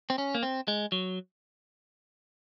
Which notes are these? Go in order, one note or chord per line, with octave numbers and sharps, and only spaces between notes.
C4
C#4
A#3
C4
G#3
F#3